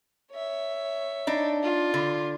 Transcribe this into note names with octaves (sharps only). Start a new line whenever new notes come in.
C#5 E5
D4 D#4
F4
D3